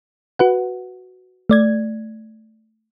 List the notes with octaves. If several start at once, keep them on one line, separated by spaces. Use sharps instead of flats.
F#4 B4 F#5
A3 D5 G#6